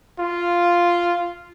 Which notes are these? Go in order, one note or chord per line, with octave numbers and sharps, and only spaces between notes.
F4